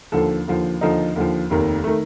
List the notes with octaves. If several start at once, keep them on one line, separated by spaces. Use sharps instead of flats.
D#2 D3 F3 A4
D#2 D3 F3
D#2 D3 F3 D#4
D#2 D3 F3
F1 D#2 D#3
D#3 A3